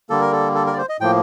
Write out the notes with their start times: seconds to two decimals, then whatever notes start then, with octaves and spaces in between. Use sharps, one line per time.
0.10 D3 G3 A#3 A4
0.21 A#4
0.32 A4
0.55 A4
0.67 A#4
0.73 D5
0.78 C5
0.89 D#5
1.00 A2 F3 A#3 G5